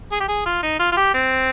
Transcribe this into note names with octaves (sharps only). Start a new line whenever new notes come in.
G#4
G4
G#4
F4
D#4
F4
F4
G4
C4